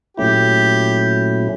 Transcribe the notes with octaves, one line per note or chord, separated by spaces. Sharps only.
A#2 F#3 A3 C#4 E4 G4